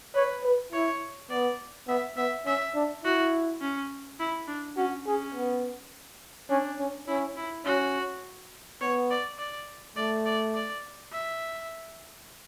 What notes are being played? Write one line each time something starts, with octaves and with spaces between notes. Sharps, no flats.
B4 C#5
B4
E4 C#5
B3 D5
B3 E5
B3 E5
C#4 E5
D4
E4 F#4
C#4
E4
D4
C#4 F#4
C#4 G#4
B3
C#4 D4
C#4
C#4 E4
E4
C#4 F#4
B3 C#5
D5
D5
A3 D5
D5
D5
E5